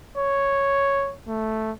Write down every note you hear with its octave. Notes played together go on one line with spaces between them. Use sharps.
C#5
A3